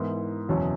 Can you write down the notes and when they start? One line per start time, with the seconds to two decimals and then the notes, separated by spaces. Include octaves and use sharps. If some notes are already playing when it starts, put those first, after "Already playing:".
Already playing: G#2 E3 B3 E4 A#4
0.48 F#1 E2 B2 F#3 C#4